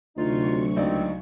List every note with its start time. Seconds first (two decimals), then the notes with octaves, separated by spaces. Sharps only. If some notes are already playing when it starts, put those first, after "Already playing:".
0.17 D2 C3 F#3 D#4 F4 C#6
0.76 C#2 C4 D#4 D5